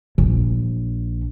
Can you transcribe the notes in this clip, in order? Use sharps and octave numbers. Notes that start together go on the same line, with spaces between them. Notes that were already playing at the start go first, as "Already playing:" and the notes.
A#1